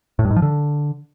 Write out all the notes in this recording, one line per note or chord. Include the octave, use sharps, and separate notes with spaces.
A2
G2
G#2
F3
D3